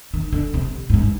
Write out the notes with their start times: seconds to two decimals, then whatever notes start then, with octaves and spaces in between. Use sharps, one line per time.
0.14 D#3
0.32 D3
0.54 C3
0.90 G#2
0.94 G2